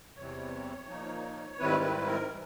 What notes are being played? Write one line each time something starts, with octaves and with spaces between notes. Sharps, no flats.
E2 C3 E3 G3 C4 C#5
A#2 F3 A#3 D#4
G#2 D#3 G3 C4 E4 B4
B4
A#4
E3